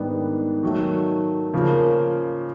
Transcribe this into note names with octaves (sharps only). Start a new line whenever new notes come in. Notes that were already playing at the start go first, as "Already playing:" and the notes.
Already playing: G#2 D#3 G3 B3 D4
D#3 F#3 A3
C#3 F3 A#3